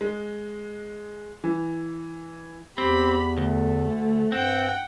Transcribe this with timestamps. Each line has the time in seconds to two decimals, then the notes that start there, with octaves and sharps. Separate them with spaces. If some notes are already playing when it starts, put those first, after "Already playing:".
0.01 G#3
1.44 E3
2.78 E2 C4 G4 B5
3.38 D2 A3
3.88 D3
4.32 G2 C4 F#5 G5